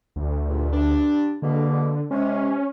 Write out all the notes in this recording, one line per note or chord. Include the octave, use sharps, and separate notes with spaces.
D2
C#2 G2 A#2
G2 G3 D4
B2 D3 G#3 A#3
C3 G#3 C#4